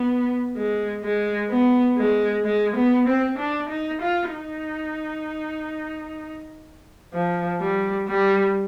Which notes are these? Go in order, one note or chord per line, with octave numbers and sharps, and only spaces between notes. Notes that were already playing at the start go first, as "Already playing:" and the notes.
Already playing: B3
G#3
G#3
B3
G#3
G#3
B3
C4
D4
D#4
F4
D#4
F3
G3
G3